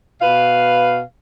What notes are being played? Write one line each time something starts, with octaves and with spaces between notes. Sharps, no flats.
B2 B4 F5